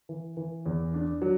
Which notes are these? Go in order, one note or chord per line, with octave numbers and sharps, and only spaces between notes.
E3
E3
E2
D4
F#3